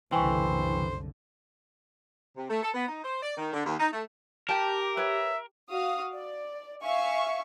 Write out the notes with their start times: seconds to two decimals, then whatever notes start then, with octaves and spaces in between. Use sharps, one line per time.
0.12 F#1 C2 D3 E3 C5 G5 G#5 C#6
2.37 C3
2.49 A3
2.62 A4
2.74 B3
2.88 D#4
3.03 C5
3.23 D5
3.37 D#3
3.53 D3
3.66 D#2
3.79 D#4
3.92 A3
4.49 G4 A#4 G5 A5
4.97 B4 C#5 E5
5.70 F#4 F5 D#6
6.14 D5
6.84 E5 F5 G#5 C#6